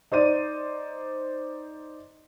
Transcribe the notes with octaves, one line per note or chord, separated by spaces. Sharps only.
D#4 C5 D5 D#7